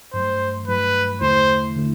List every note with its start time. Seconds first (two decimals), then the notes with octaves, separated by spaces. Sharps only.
0.13 G2 F#3 A3 C5
0.68 G2 F#3 A3 B4
1.21 E2 D3 A3 E4 C5
1.76 D3 A3 E4